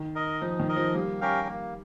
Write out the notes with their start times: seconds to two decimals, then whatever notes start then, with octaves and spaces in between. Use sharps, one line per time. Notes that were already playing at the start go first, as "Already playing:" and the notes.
Already playing: D#3
0.15 A#4 D#5
0.41 F3 D#4
0.59 D#3
0.69 A#4 D#5
0.76 F3
0.94 G3 A#3
1.21 C#4 G4 A#4 F5
1.47 A#3